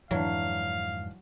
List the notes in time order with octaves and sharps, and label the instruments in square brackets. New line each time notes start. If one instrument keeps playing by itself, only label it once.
[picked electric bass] F2 G#2 D3 [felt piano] E3 D4 [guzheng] F#3 [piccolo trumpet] F5